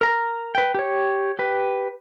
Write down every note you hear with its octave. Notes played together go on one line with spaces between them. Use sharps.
A#4 A#5
B4 G5
G4 C#5
G4 B4